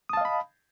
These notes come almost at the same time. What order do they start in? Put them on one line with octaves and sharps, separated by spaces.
D#6 A5 F5 D#5 B5